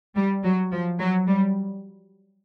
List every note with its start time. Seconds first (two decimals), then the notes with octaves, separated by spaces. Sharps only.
0.15 G3
0.43 F#3
0.72 F3
0.99 F#3
1.27 G3